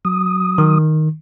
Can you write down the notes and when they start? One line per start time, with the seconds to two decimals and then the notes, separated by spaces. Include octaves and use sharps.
0.05 F#3 D#6
0.58 D#3